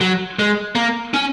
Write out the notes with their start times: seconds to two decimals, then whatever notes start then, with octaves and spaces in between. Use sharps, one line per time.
0.01 F#3
0.39 G#3
0.75 A#3
1.14 C#4